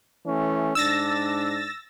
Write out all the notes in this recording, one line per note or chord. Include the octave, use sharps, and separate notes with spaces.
E3 A3 C#4
G#2 D4 E6 A6 A#6